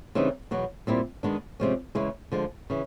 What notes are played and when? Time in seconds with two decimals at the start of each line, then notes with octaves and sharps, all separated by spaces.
0.15 C#3 E3 G3 C4 D#4
0.51 E2 B2 F#3
0.87 A#2 G3 C4 E4
1.23 D#3 G#3 B3 D4
1.60 C3 F3 G#3 C#4
1.95 C#3 E3 G#3 C#4 E4
2.32 D3 F3 G#3
2.70 C#3 E3